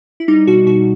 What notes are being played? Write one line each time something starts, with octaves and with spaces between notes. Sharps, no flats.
E4
G3 D#4
B2 F#4
B2 F#4